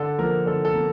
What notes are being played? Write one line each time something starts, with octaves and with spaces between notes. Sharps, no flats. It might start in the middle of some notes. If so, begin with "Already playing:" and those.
Already playing: D3 A4
F3 A#3 A#4
D3 A4
A4
A#3